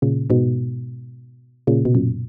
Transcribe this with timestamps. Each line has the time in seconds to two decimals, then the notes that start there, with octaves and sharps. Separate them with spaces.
0.02 A#2 C#3
0.30 G#2 B2
1.67 A#2 C#3
1.85 B2
1.95 F#2 A#2